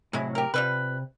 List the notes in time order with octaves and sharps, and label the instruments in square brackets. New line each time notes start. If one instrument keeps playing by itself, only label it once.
[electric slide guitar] A2 C3 F#3 [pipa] G#3 E4
[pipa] G4 A#4
[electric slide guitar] C3 [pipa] F3 G3 B4